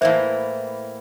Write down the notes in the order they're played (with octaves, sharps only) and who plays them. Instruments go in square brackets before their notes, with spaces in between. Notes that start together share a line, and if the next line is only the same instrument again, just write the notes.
[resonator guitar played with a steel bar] A2 E3 A#3 [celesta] C5 E5